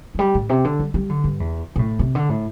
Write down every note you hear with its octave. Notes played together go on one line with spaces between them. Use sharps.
E3
G3
A2
C3
D3
G3
G3
D3
G2
E2
C3
A2
C3
D3
A2